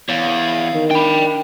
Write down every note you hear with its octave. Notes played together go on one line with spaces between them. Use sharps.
E2 C#5 F5
D#3
D4 G5 B5